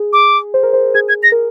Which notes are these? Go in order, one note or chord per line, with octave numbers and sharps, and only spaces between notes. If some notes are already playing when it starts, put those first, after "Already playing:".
Already playing: G#4
D6
C5
A#4
C5
G#4 G#6
G#6
A#6
A#4